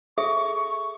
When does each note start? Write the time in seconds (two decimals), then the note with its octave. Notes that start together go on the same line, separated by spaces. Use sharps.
0.18 G#4 A4 E5 C#6